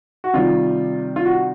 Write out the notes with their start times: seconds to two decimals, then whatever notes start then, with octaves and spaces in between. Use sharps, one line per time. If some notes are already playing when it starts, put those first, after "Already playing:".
0.24 F#4
0.34 C3 D#3 G3 F4
1.16 F4
1.25 F#4